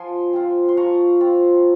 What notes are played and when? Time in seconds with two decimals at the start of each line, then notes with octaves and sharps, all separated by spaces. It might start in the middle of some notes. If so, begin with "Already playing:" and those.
Already playing: F3 G#5 C6
0.33 C4 F4
0.69 C6
0.77 F3 A#5 C#6
1.20 C4 F4